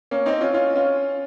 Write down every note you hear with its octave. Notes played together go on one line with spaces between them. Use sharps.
A#3 C#4
C4 D#4
C#4 F4
C#4 F4
C#4 F4